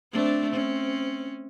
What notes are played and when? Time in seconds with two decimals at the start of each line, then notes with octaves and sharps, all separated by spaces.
0.12 A3 C4 D4
0.50 C4 C#4